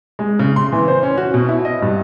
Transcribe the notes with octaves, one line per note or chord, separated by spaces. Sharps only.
G#3
C#3
C6
E3
C5
C#4
F#4
B2
E4
D#5
G2